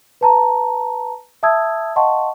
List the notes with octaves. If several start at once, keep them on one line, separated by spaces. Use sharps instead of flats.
B4 A5 A#5
E5 A5 D#6 E6 G#6
D#5 F5 F#5 A5 C6 C#6